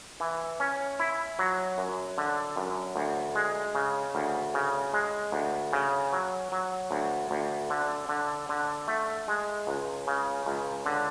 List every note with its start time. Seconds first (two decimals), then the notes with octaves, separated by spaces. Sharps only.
0.20 E3
0.60 C#4
0.99 E4
1.39 F#3
1.78 F#2
2.18 D3
2.56 F#2
2.96 D2
3.35 G#3
3.75 C#3
4.15 D2
4.54 C#3
4.93 G#3
5.32 D2
5.73 C#3
6.13 F#3
6.52 F#3
6.91 D2
7.31 D2
7.70 D3
8.09 D3
8.49 D3
8.88 A3
9.28 G#3
9.67 C#2
10.07 C#3
10.46 C#2
10.86 D3